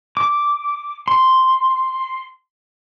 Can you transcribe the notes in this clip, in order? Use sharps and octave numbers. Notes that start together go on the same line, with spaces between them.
D6
C6